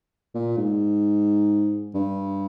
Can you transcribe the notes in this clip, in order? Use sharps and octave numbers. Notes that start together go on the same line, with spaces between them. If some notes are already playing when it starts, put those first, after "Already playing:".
A#2
G#2
G2